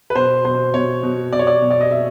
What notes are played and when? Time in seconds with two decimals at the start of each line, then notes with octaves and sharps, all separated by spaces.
0.10 B4
0.15 B2 C5
0.45 B2 C5
0.74 B2 C#5
1.03 B2
1.33 B2 D5
1.39 C#5
1.47 D5
1.62 B2
1.71 D5
1.81 D#5
1.90 B2 E5